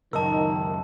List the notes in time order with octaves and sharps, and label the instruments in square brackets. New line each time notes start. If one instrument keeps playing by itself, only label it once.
[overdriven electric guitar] C#2 F#2 [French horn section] D#3 [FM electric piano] A#4 D#5 [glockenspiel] A5 E6